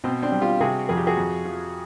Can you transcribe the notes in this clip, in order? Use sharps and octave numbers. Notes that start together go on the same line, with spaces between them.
B2 C4
C4 D4
G3
F4 G4
C3 F#4 G#4
F2 G#4
G4
F#4 G#4
F2
F3